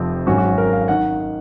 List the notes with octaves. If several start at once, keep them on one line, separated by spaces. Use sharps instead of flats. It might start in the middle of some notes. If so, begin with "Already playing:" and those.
Already playing: F1 F2 C3 F3 C4
G#1 G#2 F#3 C#4 F#4
F#4
A#4
F5
D#3 F#5